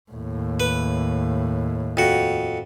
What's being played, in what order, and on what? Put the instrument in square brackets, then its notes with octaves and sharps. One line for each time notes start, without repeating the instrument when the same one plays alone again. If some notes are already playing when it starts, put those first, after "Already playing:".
[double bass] D#2 A2
[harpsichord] B4
F2 F#4